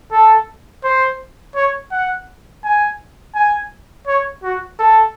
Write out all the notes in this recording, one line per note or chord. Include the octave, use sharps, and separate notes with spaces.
A4
C5
C#5
F#5
G#5
G#5
C#5
F#4
A4